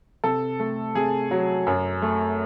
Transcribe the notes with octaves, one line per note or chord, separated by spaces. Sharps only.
C3 A4
A3
C3 G#4
F#3
F#2
A3